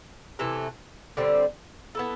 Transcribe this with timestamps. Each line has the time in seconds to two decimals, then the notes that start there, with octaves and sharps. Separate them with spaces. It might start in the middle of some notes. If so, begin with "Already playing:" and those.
0.39 C3 E3 A3
1.17 D3 G3 C4
1.95 B3 E4 A4